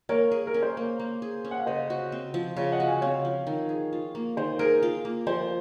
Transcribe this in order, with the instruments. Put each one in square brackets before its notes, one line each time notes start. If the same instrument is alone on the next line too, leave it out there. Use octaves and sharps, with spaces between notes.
[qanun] A#3 [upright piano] A#4 C#5
[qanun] G#4
[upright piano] A#4
[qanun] C#4
[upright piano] C5
[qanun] A#3
A#3
G#4
C#4
[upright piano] F#5
F5
[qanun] C#3 [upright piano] C5 D#5
[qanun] F#4
C4
F3
[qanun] C#3 [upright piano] C#5 F5
[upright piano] D#5 F#5
[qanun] F#4
[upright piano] F5 G#5
[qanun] C4 [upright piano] C#5 F5
[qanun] F3
D#3
G#4
F4
A#3
[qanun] D#3 [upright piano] C5
[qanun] G#4 [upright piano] A#4
[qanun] F4
A#3
[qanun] F3 [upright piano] C5